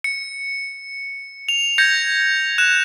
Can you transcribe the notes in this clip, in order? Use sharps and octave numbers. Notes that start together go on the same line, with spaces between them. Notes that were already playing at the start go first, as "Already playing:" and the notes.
C#7
F7
G6 G#6 A#6 C#7
F#6 E7